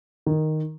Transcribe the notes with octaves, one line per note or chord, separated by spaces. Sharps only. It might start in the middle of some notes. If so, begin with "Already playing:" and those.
D#3